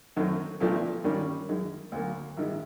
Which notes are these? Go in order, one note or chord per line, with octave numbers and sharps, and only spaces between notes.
F#2 D#3 F#3 A3 C4
B1 A#2 F3 A3 D4
G2 D#3 G3 A#3 C#4
F#2 D#3 G#3
D2 D3 F#3 A#3
A1 G2 D#3 G#3